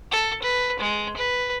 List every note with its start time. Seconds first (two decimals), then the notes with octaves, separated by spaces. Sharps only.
0.12 A4
0.42 B4
0.80 G#3
1.17 B4